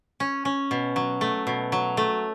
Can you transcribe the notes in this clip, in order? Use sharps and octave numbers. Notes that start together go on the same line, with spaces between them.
C#4
C#4
B2
F#3
A3
B2
F#3
A3